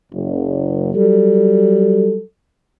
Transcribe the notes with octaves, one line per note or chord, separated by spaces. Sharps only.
F#1
F#3 G3 A4